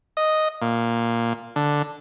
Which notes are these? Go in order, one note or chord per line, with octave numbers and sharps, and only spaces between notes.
D#5
A#2
D3